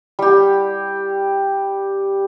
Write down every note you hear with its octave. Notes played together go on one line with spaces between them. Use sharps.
G3 G4